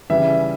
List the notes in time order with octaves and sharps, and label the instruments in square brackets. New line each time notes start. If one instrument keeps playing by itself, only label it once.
[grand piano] C#3 E3 G3 E5